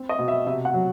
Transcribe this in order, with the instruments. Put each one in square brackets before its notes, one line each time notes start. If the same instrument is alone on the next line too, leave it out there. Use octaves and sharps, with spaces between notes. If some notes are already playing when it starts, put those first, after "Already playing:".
Already playing: [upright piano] C4
D#5
B2
E5
C3 E5
F#5
F#3